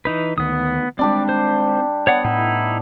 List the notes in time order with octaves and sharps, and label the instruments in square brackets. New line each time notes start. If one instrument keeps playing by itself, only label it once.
[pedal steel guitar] E3 D#4 B4
[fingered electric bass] D2 D#3 [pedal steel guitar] B3 D#6
[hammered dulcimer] G3 D4 G4 [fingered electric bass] G#3 C4 [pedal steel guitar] D5
[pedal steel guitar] C5
[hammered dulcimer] B3 [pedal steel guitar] C#5 D5 F#5
[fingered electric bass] A2 [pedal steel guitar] D#4 E4